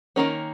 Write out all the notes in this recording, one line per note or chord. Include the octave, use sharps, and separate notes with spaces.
D#3 G3 A#3 C#4